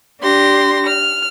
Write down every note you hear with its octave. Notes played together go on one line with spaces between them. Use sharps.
D4 G4 C6 A#6
F6